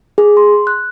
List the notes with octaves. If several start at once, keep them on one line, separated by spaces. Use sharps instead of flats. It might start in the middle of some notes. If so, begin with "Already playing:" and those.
G#4
C6
F#6